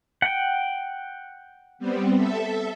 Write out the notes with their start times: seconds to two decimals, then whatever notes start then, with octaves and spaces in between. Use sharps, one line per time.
0.22 F#5 G5
1.79 G3 B3 C4
2.17 A4 E5